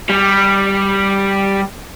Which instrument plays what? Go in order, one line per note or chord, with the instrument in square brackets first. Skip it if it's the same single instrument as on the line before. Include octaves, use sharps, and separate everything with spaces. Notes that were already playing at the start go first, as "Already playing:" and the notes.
[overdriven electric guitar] G3